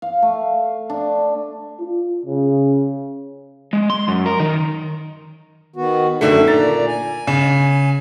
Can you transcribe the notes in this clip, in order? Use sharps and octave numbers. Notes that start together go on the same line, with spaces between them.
F5
A3
D4
F4
C#3
G#3
C6
F#2
A#4
D#3
D#3 B3 F#4
F#2 D3 D#3 A3
A#2 D5 A#5 A6
G#5
C#3